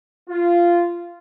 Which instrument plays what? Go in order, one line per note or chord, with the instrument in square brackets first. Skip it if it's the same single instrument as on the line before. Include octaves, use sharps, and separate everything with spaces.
[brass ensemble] F4